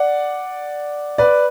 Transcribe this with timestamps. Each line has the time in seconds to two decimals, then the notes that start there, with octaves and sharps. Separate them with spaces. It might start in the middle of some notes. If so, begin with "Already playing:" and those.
Already playing: D5 F#5
1.18 B4 D5